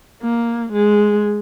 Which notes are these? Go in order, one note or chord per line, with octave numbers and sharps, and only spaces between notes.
A#3
G#3